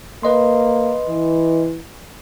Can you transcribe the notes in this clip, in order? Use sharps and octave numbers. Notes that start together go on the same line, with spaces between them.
A#3 B4 D#5 C6
E3